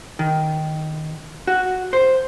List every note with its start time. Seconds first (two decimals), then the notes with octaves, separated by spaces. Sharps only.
0.19 D#3
1.47 F#4
1.93 C5